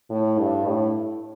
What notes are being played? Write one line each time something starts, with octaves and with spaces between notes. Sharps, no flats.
A2
G2
A2